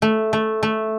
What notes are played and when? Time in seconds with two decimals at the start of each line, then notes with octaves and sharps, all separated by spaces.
0.02 A3
0.33 A3
0.63 A3